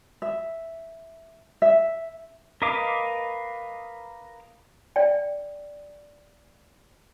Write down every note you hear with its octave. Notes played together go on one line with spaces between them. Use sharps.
E5
E5
A#4 B4 D#5 F5 D6
D5 G5